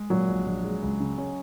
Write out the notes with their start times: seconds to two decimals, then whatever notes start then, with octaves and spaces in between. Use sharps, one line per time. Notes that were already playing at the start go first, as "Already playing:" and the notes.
Already playing: G#3
0.10 A#2 F#3
0.28 A#1
0.46 A#1
0.64 G#3
0.82 C#2
1.00 C#3
1.18 C#4